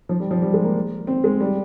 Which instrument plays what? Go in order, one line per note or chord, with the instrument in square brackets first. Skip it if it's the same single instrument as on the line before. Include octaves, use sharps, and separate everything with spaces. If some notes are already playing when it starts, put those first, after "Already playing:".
[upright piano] F3
G3
F3
G3
G#3
A#3
C4
G#3
G3